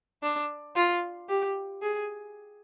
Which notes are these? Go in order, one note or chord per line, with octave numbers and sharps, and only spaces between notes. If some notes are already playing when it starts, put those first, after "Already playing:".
D4
F4
G4
G#4